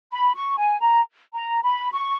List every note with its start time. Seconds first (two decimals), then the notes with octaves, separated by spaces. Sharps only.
0.12 B5
0.36 C#6
0.58 G#5
0.80 A#5
1.33 A#5
1.63 B5
1.94 C#6